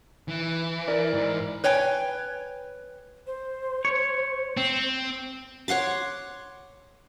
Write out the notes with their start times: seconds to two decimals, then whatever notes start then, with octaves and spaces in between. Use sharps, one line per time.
0.28 E3
0.88 E4 A#4 D5
1.14 G#2
1.64 B4 C#5 G5 G#5
3.27 C5
3.85 C#5
4.57 C4
5.68 C#5 F#5 C6 D6